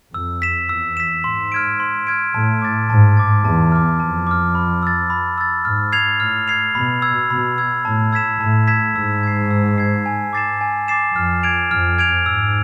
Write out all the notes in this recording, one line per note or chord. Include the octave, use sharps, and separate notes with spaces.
F2 E6
B6 E7
E2 E6
B6 E7
G#2 C6
F6 G#6 D7
C6
F6 G#6 D7
A2 A5
D6 A6
G#2 A5
D6 A6
E2 A5
D6 F6
F2 A5
D6 F6
B5
E6 A6
B5
E6 A6
G#2 F6
G#6 C7 F7
A2 F6
G#6 C7 F7
B2 B5
E6 G#6
B2 B5
E6 G#6
A2 A5
E6 G#6 B6 E7
A2 A5
E6 G#6 B6 E7
G#2 E6
G#6 C7
E6
G#6 C7
G#5
D6 A6 C7 E7
G#5
D6 A6 C7 E7
F2 F6
G#6 D7 F7
F2 F6
G#6 D7 F7
G#2 E6